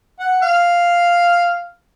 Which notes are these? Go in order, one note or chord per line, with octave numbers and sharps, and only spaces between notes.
F#5
F5